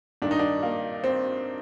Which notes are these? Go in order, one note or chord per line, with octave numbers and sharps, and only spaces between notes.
G2 D#3 D4
D#4
D4
A#3
C4